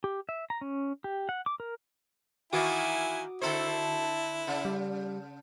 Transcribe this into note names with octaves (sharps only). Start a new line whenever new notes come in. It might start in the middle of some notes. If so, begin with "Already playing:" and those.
G4
E5
A#5
C#4
G4
F#5
D6
A#4
D#3 E3 A#3 E4 F#4 G#5 D6 D#6
D3 E4 A4 C5
C#3
G3